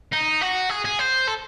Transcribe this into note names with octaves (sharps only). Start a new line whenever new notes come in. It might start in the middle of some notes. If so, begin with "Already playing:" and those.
D#4
F#4
G#4
G#4
C5
A4